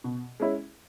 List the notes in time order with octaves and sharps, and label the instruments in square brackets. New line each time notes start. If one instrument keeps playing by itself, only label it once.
[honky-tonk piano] B2
G#3 C#4 E4